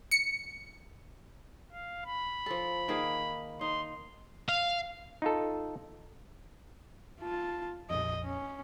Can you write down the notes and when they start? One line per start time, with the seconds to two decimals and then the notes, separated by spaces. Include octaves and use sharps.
0.11 C#7
1.72 F5
2.06 B5
2.46 F3 A4
2.88 D#3 A#3 G#4
3.61 D#4 C6
4.49 F5
5.22 D#4 F4 A4
7.20 F4 A5
7.90 A#1 F2 D#5
8.23 C#4